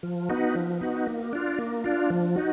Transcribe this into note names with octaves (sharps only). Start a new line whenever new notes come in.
F3
B3 D#4 F#4
F3
B3 D#4 F#4
A#3
D4 F4
A#3
D4 F4
F3
D#4 F#4